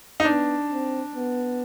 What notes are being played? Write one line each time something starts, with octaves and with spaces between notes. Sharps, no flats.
D#4
B3 D4
C4
B3